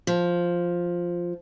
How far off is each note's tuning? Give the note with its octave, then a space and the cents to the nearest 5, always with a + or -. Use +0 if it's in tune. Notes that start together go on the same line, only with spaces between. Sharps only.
F3 +0